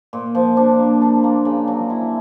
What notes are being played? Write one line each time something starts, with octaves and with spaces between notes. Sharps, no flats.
A#2
F3
D4
A#3
D4
A#3
C#3
F#3
E4